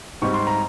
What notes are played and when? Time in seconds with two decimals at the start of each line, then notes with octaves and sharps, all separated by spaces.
0.22 G#2 G3 C4 C#6
0.34 C6
0.47 A#5